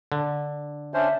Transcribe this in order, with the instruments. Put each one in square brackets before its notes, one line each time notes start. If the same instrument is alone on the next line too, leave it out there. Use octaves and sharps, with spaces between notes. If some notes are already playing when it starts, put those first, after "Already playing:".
[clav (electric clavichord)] D3
[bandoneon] C#4 D4 C5 [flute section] E5